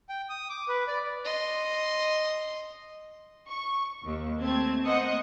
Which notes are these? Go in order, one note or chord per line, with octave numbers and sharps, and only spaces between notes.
G5
D#6
D6
B4
D5
D#5 C6
C#6
D#2
A3 C4 A5 G#6
A#3 C5 D#5 F#5 D#6 C#7